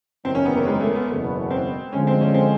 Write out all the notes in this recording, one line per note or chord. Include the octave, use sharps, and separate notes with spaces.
F#1 E2 C3 D#3 F#3 C4
C#4
B3
A#3
G#3
A3
B3
F#1 E2 B2 B3
C4
D2 D3 F3 G#3 C#4
C4
C#4
C4